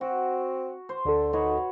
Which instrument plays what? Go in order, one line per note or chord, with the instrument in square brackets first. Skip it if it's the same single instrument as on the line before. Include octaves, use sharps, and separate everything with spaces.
[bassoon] C4 [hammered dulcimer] F#4
[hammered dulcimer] C5
[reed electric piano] D2 A4 [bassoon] D3
[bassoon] D#4 [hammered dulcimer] F#4 B4 C#5